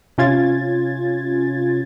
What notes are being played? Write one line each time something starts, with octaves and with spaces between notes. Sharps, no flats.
C3 C#4 F4 G#6 A6